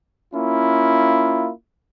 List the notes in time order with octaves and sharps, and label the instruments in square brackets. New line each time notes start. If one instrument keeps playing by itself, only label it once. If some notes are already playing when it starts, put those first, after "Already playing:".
[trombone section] A#3 C#4 E4 F4